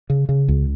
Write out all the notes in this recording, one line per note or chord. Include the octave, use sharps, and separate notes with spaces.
C#3
C#3
C#2